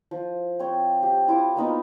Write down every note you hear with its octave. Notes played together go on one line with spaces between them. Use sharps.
F3
C4 C#5
G4
E4 F4 D6 D#6
A#3 B3 D#4 F4